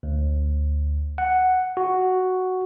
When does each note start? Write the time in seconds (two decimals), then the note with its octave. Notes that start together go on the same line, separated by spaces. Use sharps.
0.03 D2
1.18 F#5
1.77 F#4